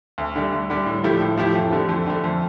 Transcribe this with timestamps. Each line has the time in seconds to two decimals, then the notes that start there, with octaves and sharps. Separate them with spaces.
0.18 D2
0.36 D3 G3
0.52 D2
0.70 D3 G3
0.86 A2
1.04 F3 A3 E4 G4
1.21 A2
1.37 F3 A3 E4 G4
1.55 F2
1.72 D3 A3
1.89 F2
2.06 D3 A3
2.24 F2